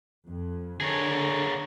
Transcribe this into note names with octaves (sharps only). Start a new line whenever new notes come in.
F2
D3 G#4 A#4 C#5